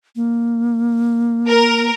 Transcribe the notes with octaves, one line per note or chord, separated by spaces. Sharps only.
A#3
A#4